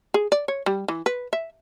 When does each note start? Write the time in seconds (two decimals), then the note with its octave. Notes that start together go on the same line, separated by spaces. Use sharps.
0.14 G#4
0.32 D5
0.48 C#5
0.66 G3
0.88 E3
1.06 B4
1.33 E5